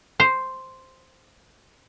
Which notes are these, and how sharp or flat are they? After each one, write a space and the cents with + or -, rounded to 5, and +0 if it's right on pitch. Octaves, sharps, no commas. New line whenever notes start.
C5 +0